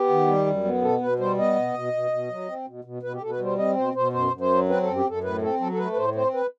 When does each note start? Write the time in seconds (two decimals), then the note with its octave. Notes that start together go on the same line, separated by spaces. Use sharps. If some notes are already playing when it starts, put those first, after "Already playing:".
Already playing: B3 G4
0.09 D#3
0.27 G3
0.46 F#2
0.64 B3
0.82 B2 A4
1.01 B2 B4
1.19 G3 C5
1.37 B3 D#5
1.56 B2
1.74 B2
1.93 B2
2.11 B2
2.30 F#3
2.48 C4
2.67 B2
2.84 B2
3.02 B2 B4
3.14 G4
3.22 B2 A4
3.30 B4
3.40 G3 C5
3.58 C4 D#5
3.76 B2 C5
3.95 B2 C5
4.13 F#2 C5
4.32 F#2
4.41 C5
4.50 F#3
4.68 C4 B4
4.82 F#2 A4
4.96 G4
5.06 F#2 A4
5.23 A2 B4
5.42 C4 A4
5.60 F#3 A4
5.72 A4
5.78 A3 B4
5.93 B4
5.97 A2 C5
6.15 C4 C5
6.34 B4